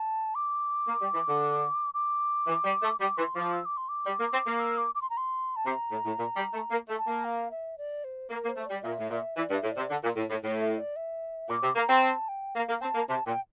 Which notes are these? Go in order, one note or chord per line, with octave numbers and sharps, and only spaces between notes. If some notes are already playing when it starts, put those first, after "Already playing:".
Already playing: A5
D6
A#3
G3
E3
D3
D6
E3
G3
A3
G3 D6
E3 C6
F3 D6
E6
D6
C6
D6
G3
A#3
C4
A#3
E6
D6
D6
C6
A#5
C6
A5
C3 A#5
A2
A2
A#2
G3
A3
A#3
A3
A5
A#3
F5
E5
D5
C5
A#3 A#4
A#3
C5
A3
G3 D5
A#2 E5
A2
A#2 E5
E3 D5
G2
E5
A2
D5
C3
D3
A#2
A2
A2
A2
E5
D5
E5
A#2 D6
C3
A#3 A#5
C4
A5
G5
A#3 F5
A#3
C4 A5
A#3
C3 A5
A#2 G5